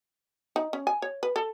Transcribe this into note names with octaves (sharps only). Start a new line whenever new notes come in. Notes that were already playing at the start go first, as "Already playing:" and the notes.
D#4
C#4
G#5
C#5
B4
A4